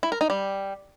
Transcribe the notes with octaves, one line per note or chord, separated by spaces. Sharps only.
E4
A#4
D#4
G3